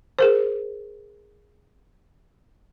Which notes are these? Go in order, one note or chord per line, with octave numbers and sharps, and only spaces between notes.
G#4 A#4 C5